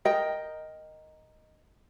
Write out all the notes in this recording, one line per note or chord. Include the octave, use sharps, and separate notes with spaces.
A#4 D#5 G5